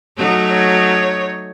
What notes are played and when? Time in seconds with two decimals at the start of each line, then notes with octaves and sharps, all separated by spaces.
0.17 F#3 A3 D#4
0.49 C#5